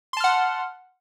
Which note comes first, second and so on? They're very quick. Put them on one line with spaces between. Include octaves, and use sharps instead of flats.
C6 A5 F6 F#5